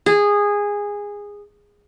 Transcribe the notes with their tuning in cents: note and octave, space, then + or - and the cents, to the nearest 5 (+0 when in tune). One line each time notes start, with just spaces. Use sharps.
G#4 -15